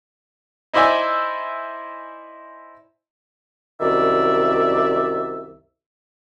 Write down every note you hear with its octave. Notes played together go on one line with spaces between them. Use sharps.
D#4 E4 C5 D5 E5 G#5
C2 F#2 D#3 D5 E5